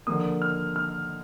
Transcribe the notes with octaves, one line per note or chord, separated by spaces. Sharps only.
D3 F3 A#3 D#6
F6
F6